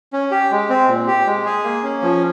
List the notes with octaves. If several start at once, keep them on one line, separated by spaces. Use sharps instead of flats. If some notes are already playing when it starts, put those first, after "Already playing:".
C#4
G4
G#3
C4
A#2
G4
G#3
G#4
A#3
C#4
F3